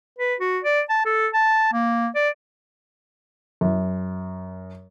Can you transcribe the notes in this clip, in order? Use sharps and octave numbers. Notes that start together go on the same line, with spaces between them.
B4
F#4
D5
A5
A4
A5
A#3
D5
F#2